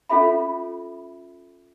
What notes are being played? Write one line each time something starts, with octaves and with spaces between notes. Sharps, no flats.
C#4 F4 A4 E5 B5